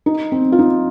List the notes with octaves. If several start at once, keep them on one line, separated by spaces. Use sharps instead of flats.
D#4
C4
F4
D#4